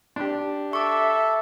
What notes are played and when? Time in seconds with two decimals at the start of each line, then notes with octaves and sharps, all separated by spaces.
0.16 D4 G4
0.73 A4 E5 C#6 D6